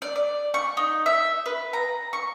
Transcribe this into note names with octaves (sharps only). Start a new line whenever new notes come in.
D5
D5
C#6
D#4
E5
B4
A#5
C#6